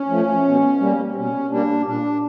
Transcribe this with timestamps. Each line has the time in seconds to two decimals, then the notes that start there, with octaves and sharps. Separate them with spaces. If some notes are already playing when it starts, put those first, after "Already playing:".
Already playing: C#4
0.09 F3 A3
0.45 B2
0.80 G3 A#3
1.11 C4
1.15 B2 C#4
1.50 G3 A#3 D4
1.85 A#2 D4